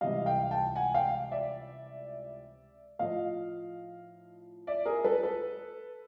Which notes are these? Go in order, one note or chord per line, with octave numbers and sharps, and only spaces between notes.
C#2 C3 E3 G3 D#5 F5
F5 G5
G5 A5
F#5 G#5
F5 G5
D5 E5
A2 F3 D#5 F5
D5 E5
G#4 A#4
A4 B4
A4 B4